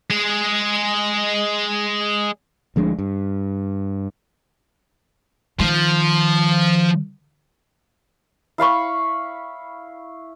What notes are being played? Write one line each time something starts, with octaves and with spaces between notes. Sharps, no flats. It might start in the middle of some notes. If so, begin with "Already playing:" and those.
G#3 G#4
D2 F3 G#3 D4
G2
D#3 F3
E4 F5 B5 C#6